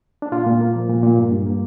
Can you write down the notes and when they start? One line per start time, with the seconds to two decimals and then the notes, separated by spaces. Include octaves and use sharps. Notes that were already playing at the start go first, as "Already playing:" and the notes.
0.22 D4
0.32 A#2 F4
0.46 A#2
0.61 A#3
0.75 F3
0.89 A#2
1.03 A#2
1.18 G2
1.32 G2
1.46 A#3